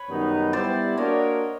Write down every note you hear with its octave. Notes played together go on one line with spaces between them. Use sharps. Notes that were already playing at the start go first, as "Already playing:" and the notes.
Already playing: B4 C#5
F#2 D#3 G3 B3 D#4
G3 B3 E4 C5 D5
A#3 D4 F#4 A#4 C#5 D#5